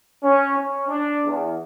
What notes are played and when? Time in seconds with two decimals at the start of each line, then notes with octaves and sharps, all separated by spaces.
0.23 C#4
0.55 C#4
0.89 D4
1.25 E2